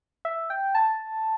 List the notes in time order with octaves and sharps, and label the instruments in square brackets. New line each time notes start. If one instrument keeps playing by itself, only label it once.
[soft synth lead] E5
G5
A5